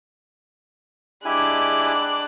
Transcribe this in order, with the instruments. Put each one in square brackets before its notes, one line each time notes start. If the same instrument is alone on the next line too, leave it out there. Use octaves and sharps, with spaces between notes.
[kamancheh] G#3 D6 [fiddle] D4 F#6 [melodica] E4 G4 G#5